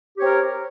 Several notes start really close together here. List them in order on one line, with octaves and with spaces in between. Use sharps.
G4 C#5 C4 A#4